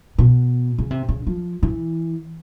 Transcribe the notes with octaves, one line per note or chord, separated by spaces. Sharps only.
B2
C#3
C3
C#3
F3
E3